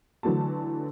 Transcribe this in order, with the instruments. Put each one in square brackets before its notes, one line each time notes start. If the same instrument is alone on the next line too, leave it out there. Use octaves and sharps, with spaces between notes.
[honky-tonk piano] D3 E3 F#3 A3 A5